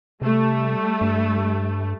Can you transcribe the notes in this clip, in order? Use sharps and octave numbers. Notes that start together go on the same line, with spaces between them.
C3 G3 A3
G2